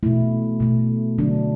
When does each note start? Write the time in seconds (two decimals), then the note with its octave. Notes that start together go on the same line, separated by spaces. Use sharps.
0.03 B2 A3 E4
0.60 B2 A3
1.18 D3 F#3 A3 D4